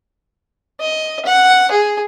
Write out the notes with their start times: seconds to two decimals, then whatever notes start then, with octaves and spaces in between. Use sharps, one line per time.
0.81 D#5
1.26 F#5
1.71 G#4